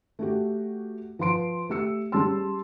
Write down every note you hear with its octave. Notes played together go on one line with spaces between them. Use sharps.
A3 F#4 G4
F3 B4 C6 D7
A3 G4 E6 C#7
G3 C#4 G#4 A5 C6 E6